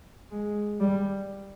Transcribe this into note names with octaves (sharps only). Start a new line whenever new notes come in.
G#3
G3